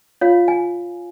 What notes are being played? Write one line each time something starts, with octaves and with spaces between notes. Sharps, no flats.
F4 C#5 F5
G#5